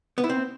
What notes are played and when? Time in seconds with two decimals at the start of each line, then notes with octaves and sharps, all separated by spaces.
0.18 B3
0.24 E4
0.29 C4